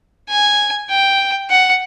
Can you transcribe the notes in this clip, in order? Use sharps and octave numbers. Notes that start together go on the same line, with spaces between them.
G#5
G5
F#5